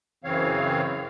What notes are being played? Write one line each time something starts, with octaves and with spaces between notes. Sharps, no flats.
F#2 C#3 E3 C4 C#5 F5